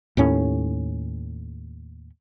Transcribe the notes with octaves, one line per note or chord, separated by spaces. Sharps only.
D#2 A2 C#4